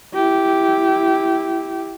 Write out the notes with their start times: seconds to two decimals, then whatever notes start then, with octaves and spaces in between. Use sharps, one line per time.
0.14 E4 G4